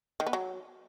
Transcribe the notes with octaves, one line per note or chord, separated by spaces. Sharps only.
D#3
B3
F#3